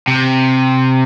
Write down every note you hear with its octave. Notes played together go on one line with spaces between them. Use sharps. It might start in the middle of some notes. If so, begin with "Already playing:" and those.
C3